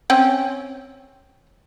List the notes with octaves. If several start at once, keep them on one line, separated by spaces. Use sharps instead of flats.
C4 C#4 G5